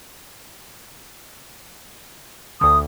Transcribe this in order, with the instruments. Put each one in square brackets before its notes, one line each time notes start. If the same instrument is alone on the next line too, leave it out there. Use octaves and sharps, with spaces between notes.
[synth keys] D2 D3 [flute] D#6